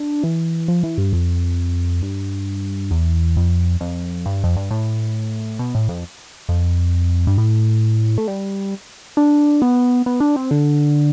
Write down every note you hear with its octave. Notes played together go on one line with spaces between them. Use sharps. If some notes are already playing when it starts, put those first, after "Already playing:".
Already playing: D4
E3
F3
E3
G2
F2
G2
E2
F2
F2
G2
F2
G2
A2
B2
A2
F2
F2
G2
A2
A3
G3
D4
B3
B3
D4
C4
D3